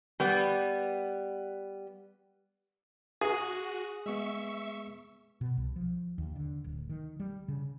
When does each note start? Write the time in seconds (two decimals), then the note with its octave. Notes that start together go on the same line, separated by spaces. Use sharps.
0.20 G3 B3
3.21 F#4 G#4
4.06 G#3 B3 E5 C#6
5.41 B2
5.57 C2
5.76 F3
6.18 D#2
6.36 D3
6.64 D1
6.89 D#3
7.20 G3
7.48 C#3